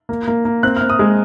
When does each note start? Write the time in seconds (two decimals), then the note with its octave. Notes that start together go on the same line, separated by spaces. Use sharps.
0.09 A#3
0.27 A#3
0.45 A#3
0.63 C4 F#6
0.77 F6
0.81 C4
0.90 D#6
0.99 G#3